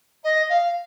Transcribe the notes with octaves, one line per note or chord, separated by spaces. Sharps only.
D#5
F5